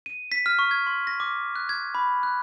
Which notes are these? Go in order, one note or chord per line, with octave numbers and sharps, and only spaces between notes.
D#7
B6
F6
C#6
G#6
C6
A#6
D6
F#6
G#6
B5
F#6